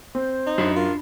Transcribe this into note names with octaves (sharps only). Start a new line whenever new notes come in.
C4 C5
D#4
F#2 D4 A5 B5
F4 A#4